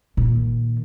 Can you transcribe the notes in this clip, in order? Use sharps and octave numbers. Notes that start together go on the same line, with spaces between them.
A#2 D#3